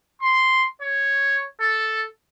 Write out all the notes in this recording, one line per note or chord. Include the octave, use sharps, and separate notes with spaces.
C6
C#5
A4